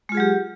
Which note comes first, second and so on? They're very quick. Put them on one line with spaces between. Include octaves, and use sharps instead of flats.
G#3 F4 G#4 F#3 G4